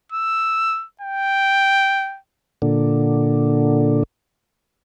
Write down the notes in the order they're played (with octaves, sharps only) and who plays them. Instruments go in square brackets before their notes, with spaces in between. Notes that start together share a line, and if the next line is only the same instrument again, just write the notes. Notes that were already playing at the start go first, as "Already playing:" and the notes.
[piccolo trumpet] E6
G5
[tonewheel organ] A#2 D3